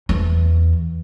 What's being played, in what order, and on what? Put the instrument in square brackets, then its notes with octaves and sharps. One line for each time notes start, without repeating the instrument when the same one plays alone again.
[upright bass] E2